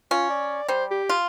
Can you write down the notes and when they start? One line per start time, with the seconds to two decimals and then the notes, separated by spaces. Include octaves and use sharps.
0.11 C#4 F4
0.30 D5
0.68 G3 C5
0.91 G4
1.09 F4